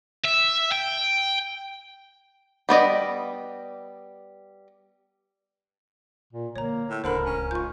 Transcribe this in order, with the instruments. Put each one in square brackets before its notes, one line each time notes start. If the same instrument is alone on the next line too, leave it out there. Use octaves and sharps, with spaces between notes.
[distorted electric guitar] E5
G5
[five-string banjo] G3 B3 D5 D#5
[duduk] A#2
[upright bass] D3 E3 [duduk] A#3 [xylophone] C#5 A#5
[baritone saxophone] A2
[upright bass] D1 C#2 [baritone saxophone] D3 [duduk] A#4 [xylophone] C5 B5
[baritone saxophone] C#4
[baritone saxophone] G#2 [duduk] F4 [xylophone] C#6 G6